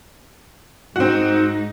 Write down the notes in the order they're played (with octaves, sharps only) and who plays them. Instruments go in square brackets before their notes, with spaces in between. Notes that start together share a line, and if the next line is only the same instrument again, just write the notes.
[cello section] G#2 D#4 [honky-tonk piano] C4 F#4